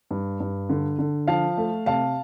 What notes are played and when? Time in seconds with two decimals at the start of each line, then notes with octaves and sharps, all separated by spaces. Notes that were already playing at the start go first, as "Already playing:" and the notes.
0.11 G2
0.40 G2
0.69 D3
0.99 D3
1.28 F3 F5 A5
1.58 A3
1.86 C3 F5 A5